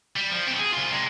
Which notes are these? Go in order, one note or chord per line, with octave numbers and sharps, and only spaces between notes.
G3
F3
B2 C4
G#4
C2 F4
C3 G#3